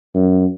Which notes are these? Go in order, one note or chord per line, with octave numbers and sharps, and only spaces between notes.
F#2